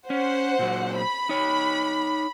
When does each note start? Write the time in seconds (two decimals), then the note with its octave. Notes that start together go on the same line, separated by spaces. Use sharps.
0.10 C#4 C5 F#5
0.59 A#2 F#3
0.95 B5
1.29 D#4 C#5